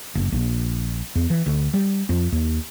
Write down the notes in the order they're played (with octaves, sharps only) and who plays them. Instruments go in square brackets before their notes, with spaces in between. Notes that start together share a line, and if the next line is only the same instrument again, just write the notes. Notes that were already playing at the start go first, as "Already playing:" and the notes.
[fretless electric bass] F#1
A#1
E2
E3
D2
G3
F2
D#2